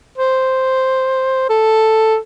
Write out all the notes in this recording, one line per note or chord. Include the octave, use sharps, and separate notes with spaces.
C5
A4